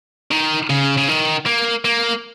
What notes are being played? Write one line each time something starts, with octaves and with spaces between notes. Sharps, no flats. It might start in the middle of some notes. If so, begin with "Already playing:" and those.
D#3
C#3
C#3
D#3
A#3
A#3